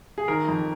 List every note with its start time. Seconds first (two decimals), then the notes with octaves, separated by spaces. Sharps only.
0.18 G#4
0.28 D#3 A#4
0.48 F2